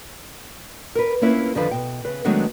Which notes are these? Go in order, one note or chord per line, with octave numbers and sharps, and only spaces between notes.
A#4 B4
A#3 C4 C#4 E4 F4 B4
F2 D3 D#3 F3 B4
B2 G5
C#3 B4
D#3 F#3 G#3 A3 B3 D4